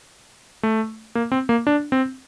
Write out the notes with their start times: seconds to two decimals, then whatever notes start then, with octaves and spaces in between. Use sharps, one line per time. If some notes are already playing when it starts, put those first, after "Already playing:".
0.63 A3
1.15 A#3
1.32 C4
1.49 A#3
1.67 D4
1.92 C4